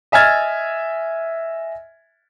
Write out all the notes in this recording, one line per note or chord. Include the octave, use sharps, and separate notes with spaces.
D#5 E5 G#5 F6 G#6 A6